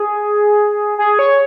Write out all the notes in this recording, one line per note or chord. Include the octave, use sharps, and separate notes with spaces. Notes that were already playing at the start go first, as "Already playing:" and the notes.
Already playing: G#4
G#4
C#5